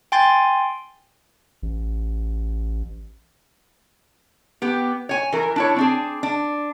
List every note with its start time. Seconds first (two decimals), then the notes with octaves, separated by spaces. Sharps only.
0.12 G5 G#5 C6 A6
1.62 A1
4.62 B3 G4
5.09 C#5 G#5
5.32 E3 A#4
5.56 D4 E4 C#5
5.76 C4 D4 G#4
6.23 D4